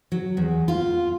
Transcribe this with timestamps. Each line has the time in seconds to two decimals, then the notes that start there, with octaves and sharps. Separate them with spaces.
0.12 F#3
0.37 E2
0.68 F4